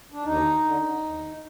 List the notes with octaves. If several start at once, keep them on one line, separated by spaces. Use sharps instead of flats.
D4
D#2 D#4
D3
D#2